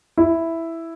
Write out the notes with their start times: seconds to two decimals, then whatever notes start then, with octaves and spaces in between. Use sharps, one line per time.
0.18 E4